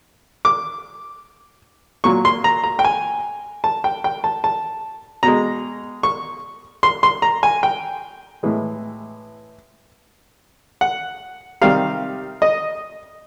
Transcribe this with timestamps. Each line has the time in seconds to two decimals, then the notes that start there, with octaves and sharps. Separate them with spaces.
0.45 D6
2.04 A#2 F#3 C#6
2.25 C6
2.44 A#5
2.64 A#5
2.79 G5
2.84 G#5
3.64 A5
3.84 G5
4.04 G5
4.24 A5
4.44 A5
5.23 B2 G#3 A#5
6.03 C#6
6.83 C6
7.03 C6
7.22 A#5
7.43 G#5
7.63 G5
8.43 A2 E3 G#3
10.81 F#5
11.61 C3 D#3 G3 F5
12.42 D#5